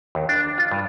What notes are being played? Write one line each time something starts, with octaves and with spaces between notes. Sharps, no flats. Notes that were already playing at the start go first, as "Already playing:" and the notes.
D#2
D4
F4
G2